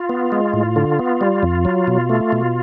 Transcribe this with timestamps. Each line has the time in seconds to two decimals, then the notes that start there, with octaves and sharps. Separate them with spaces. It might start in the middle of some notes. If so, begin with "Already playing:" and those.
Already playing: F4
0.09 B3
0.32 G#3
0.53 A2
0.76 D3
0.99 B3
1.21 G3
1.43 F2
1.65 F#3
1.87 B2
2.09 A3
2.32 B2